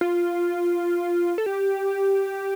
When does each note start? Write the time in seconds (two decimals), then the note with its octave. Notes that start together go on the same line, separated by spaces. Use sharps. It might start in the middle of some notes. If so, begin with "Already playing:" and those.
0.01 F4
1.38 A4
1.46 G4